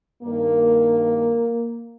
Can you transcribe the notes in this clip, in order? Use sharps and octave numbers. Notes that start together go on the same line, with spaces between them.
G2 D#3 A#3